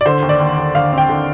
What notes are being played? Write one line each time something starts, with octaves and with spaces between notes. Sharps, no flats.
D5
D3 C5
D#2
D5
D#2
D#2
D3 F5
C4
G5
D3